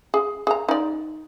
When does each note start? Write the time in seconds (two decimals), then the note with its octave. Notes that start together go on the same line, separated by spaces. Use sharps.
0.14 G#4
0.47 G#4 A#5
0.69 D#4 D5